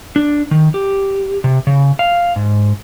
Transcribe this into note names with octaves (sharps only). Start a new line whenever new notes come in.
D4
D#3
G4
C3
C#3
F5
G#2